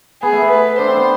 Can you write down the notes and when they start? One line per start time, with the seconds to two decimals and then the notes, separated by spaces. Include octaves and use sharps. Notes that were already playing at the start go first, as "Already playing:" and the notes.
0.22 B3 G#4
0.32 A3
0.42 B3
0.51 B4
0.79 D4 C5
0.87 C4
0.97 B3